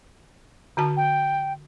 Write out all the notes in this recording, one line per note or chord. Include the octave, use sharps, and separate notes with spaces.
D3 F#4 A5
G5